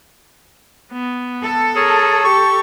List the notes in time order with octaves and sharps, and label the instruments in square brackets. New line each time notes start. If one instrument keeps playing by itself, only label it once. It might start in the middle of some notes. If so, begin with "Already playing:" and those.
[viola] B3
[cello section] A4
[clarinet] G#4 [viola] A#4 [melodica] C#5
[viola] G4 [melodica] C#6